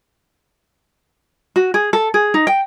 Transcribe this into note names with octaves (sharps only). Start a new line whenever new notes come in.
F#4
G#4
A4
G#4
D#4
G5